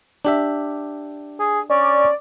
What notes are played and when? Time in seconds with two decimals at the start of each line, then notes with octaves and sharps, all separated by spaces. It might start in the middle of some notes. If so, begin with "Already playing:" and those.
0.25 D4 G4 E5
1.40 G#4
1.70 C#4 D5